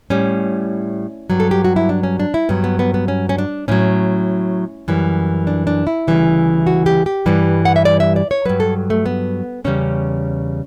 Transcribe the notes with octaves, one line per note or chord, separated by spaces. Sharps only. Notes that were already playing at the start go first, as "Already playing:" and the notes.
A2 G3 C#4
G2 F#3
A4
G4
F#4
E4
D4
C#4
D4
E4
G2 F#3 B3
B3
B3
B3
C#4
C#4
D4
A2 F#3 C#4
F#2 E3 G3
D4
D4
E4
D2 C#3 E3 G3
F#4
G4
G4
G2 E3 G3
F#5
E5
D5
E5
D5
C#5
G2 F#3 B4
A4
A3
B3
E2 C#3 G3 C#4